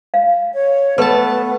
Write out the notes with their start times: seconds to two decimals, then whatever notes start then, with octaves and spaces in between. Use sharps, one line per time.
0.14 F5
0.54 C#5
0.98 A3 B3 B4 A5 D6